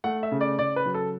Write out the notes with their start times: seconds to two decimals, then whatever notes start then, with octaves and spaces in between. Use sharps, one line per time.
0.04 A3 F#5
0.23 E5
0.32 C#3
0.41 D5
0.59 C#3 D5
0.76 B4
0.86 F#3
0.94 A4